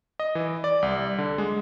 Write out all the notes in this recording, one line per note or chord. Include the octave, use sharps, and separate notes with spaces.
D#5
E3
D5
C2
D3
G#3